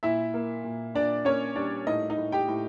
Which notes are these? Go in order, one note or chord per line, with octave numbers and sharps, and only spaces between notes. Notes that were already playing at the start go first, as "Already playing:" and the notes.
A#2 E4 E5
A#3
A#2
A#2 D4 D5
A#3 C#4 C#5
G3 D4 D5
A2 D#4 D#5
D#4 D#5
A2
G4 G5
A2